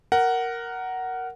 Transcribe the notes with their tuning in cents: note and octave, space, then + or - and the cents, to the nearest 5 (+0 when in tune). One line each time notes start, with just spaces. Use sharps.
A#4 +0 F#5 +10